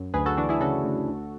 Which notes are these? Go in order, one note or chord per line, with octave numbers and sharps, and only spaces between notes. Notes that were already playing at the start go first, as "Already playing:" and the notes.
Already playing: F#2
D2 G#4 B4
F#4 A4
E3 D4 F#4
E4 G#4
C#3 F#4 A4
D2
D2